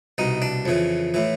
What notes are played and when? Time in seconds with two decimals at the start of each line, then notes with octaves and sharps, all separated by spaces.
0.18 C2 B2 D#4
0.42 D4
0.66 F2 C#3 E3
1.14 A2 E3